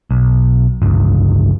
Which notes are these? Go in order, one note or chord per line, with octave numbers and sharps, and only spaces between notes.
B1
G1 C#2